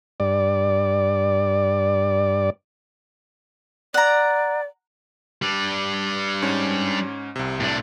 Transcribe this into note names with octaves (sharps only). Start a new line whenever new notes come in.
G2 D5
D5 F#5 A#5
G3 D4
G#2 C#4
C2 C3
A2 D4